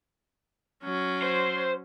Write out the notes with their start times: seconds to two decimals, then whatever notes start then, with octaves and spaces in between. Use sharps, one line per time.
0.83 F#3 C#4
1.23 C5